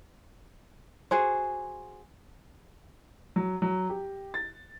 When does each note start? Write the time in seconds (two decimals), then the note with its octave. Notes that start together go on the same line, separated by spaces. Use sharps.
1.11 F#4 G#4 C5
3.36 F#3
3.62 F#3
3.90 G4
4.34 A6